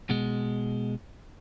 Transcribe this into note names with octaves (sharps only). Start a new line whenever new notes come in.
B2 G#3